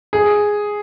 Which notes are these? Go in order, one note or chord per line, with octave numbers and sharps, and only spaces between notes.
G#4